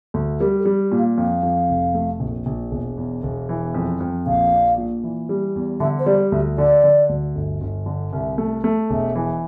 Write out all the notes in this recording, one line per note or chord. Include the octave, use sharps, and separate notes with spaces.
D2
G3 A#4
A4
G3
A#2
F5
F2 F5
F2
F1
A3
A#1
A#1
E1
E2
E1
E3
F2
F2
A#1 F5
D4
A#2
E3
G3
E2
D3 E5
C5
G3 D5
D2 E5
D3 D5
D3
D2
G1
G1
D3
C2 E5
A3
A3
E1 E5
E3